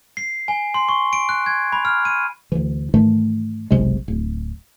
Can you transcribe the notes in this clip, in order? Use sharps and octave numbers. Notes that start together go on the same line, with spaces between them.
C7
G#5
C6
C#6
D7
F#6
G#6
B5
F6
D#7
D2 E3
G#2 D#3 E3 A3
F#1 B1 C3 G#3
D1